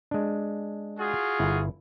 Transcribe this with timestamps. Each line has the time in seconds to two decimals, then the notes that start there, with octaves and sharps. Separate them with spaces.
0.11 G#3 D4
0.99 F4 F#4 G#4
1.39 G1 E4